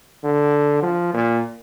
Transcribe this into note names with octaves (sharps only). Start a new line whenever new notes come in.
D3
F3
A#2